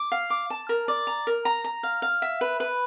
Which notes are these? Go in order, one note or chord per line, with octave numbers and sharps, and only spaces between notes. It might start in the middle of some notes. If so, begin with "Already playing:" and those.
Already playing: D6
F5
D6
A5
A#4
D5
A#5
A#4
A#5
A#5
F5
F5
E5
B4
B4